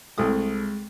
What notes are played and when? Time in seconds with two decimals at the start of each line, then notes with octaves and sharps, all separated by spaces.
0.18 C2 G#3 A3 D#6